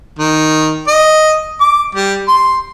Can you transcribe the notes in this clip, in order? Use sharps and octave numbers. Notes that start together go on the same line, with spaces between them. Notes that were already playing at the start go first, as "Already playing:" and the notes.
D#3
D#5
D6
G3
C6